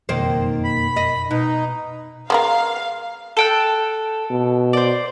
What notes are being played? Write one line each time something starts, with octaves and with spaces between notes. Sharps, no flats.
F#1 F2 B2 D#3 A#3 C5
B5
D#5
B2 D#4
G#3 B3 A#4 F5
A4 G5 F#6
B2
C5 D5